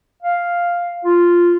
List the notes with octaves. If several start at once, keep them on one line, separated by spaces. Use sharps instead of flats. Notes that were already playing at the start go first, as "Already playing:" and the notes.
F5
F4